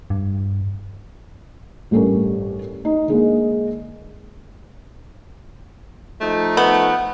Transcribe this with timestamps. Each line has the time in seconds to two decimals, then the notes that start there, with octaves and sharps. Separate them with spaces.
0.10 G2
1.91 A1 G2 A3 C#4 G4 A#4
2.85 D#4
3.08 D3 G#3 A#3
6.21 F3 A3 D#4
6.57 B3